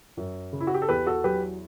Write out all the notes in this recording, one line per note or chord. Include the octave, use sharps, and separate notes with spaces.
F#2
C#3
E4
F#4
G4
A4
E2 G4 B4
F#4 A4
F#3 G4 B4